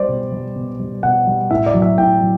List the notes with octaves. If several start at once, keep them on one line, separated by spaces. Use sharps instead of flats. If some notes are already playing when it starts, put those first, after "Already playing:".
Already playing: G3 C5 D5
B2
G3
B2
G3
B2 F#5
G3
A2 E5
D5
F#3
E5
A2 G5
F#3